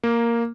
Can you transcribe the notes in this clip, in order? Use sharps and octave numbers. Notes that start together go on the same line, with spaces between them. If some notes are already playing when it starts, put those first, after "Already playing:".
A#3